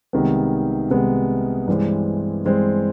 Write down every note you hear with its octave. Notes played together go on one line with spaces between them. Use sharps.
C2 C3 D#3 G#3 B3
C2 C3 D#3 G#3 B3
G2 E3 G#3 C4
G2 E3 G#3 C4